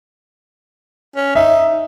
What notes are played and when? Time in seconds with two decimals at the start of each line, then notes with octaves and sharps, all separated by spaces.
1.16 C#4
1.35 D#4 E5